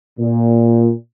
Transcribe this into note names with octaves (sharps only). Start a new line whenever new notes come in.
A#2